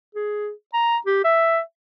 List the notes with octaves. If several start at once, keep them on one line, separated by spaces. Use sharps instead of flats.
G#4
A#5
G4
E5